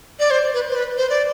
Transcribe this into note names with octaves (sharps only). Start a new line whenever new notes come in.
D5
C5
B4
C5
B4
C5
D5